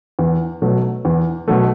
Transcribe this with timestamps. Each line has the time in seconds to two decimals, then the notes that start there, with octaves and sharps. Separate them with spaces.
0.19 E2
0.62 B2 F#3 A3
1.05 E2
1.48 B2 F#3 A3